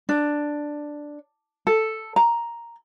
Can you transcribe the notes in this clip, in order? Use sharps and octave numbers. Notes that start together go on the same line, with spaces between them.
D4
A4
A#5